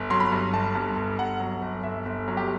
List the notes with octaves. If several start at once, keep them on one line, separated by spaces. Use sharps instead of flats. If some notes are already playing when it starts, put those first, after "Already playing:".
Already playing: G1
F#3 C6
B5
G2
G1 A5
G2
G1
G1 F#5
F#3
G1
G1 E5
G1
F#3
G4